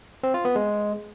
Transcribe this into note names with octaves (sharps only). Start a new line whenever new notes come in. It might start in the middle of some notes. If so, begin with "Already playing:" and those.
C4
F4
B3
G#3